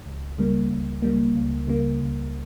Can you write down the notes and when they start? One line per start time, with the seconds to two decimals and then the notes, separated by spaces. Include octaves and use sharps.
0.06 C#2
0.38 C#3 G3 A#3
0.70 C#2
1.02 C#3 G3 A#3
1.35 C#2
1.67 C#3 G3 A#3
2.00 C#2